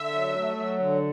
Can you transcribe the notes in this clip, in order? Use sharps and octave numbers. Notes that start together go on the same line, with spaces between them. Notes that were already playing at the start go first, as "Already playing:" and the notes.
Already playing: D3 E5
F#3
A3
F#3
D3